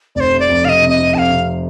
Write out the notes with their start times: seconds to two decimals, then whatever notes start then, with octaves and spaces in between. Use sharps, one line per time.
0.15 F1 D5
0.20 C5
0.31 C3
0.40 D5
0.49 F2
0.65 C3 D#5 F5
0.82 C3
0.89 D#5
0.98 F2
1.14 F2 A5
1.18 F5
1.30 C3